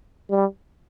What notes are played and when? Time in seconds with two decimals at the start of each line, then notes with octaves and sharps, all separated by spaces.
0.30 G3